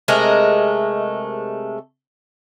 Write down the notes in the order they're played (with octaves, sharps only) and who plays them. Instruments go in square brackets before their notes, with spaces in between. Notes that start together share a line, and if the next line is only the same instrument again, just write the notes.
[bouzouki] C3 G#3 A3 A#4